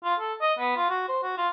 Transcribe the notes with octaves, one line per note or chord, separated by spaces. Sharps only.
F4
A4
D#5
B3
F4
F#4
C5
F#4
F4